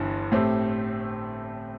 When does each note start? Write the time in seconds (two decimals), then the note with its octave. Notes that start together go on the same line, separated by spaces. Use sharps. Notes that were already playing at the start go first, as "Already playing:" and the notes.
Already playing: G1 G2 E3
0.32 A2 A3 C4 G4